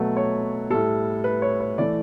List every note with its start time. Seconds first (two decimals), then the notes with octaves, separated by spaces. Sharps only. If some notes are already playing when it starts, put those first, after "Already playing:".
Already playing: B2 F#3 A3 B4
0.16 C#5
0.70 A2 G3 A4
1.24 B4
1.42 C#5
1.60 C#5
1.78 E3 A3 D5